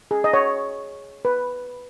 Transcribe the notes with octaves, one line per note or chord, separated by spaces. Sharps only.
G#4
D#5
C#5
B4